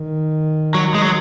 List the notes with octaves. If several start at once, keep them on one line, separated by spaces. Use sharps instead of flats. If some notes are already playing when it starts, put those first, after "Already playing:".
Already playing: D#3
F#3
G#3
F#3